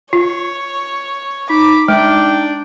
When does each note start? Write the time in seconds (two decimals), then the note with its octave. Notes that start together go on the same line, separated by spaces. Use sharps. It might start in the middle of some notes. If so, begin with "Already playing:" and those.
0.13 F4 C#5
1.50 D#4 B5 D6
1.88 G#3 D4 D5 G5